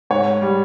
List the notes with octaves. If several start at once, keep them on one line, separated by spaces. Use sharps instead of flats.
G#2 C#5
G3